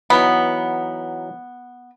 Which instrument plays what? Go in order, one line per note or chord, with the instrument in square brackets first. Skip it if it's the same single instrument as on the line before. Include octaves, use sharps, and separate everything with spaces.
[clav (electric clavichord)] E3 F#3 D#4 [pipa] B3